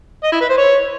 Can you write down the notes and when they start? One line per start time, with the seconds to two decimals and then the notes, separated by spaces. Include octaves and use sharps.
0.24 D#5
0.32 E4
0.41 B4
0.49 C5
0.58 C#5